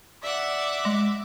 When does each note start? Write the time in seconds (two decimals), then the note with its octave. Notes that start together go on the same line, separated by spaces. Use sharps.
0.23 D5 E5 F#5 D6
0.85 G#3